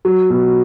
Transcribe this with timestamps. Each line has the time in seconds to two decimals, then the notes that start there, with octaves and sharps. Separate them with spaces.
0.05 F#3
0.30 B2